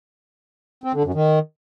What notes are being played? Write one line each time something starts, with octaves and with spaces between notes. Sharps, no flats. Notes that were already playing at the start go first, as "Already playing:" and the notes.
C4
D3
F#2
D#3